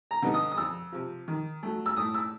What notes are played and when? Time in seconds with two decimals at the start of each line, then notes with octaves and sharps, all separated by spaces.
0.11 A#5
0.22 D3 G3 B3 D#4
0.34 D#6
0.52 D#6
0.57 F2 E6
0.92 C3 F3
1.28 D#3
1.63 F#3 A3
1.86 E6
1.97 A2 D#6
2.14 E6